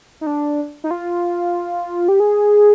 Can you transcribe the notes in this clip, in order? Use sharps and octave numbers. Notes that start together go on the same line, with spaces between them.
D#4
D4
D#4
F4
G4
G#4